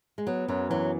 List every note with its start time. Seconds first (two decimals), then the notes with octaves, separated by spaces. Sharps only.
0.18 G#3
0.27 F#3 B3
0.48 F#2 F#3
0.70 E3 F#3